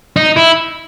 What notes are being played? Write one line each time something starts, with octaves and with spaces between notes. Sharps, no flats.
D#4
E4